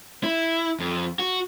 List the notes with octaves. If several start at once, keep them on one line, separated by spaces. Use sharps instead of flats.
E4
F2
F#4